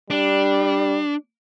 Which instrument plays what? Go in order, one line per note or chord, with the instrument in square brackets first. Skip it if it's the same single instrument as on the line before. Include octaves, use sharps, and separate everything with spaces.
[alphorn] G3 [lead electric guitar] D4